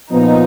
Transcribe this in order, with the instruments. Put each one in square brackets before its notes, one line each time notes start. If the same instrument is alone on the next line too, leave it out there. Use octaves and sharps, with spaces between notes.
[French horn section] A#2 F3 B3 [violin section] D#4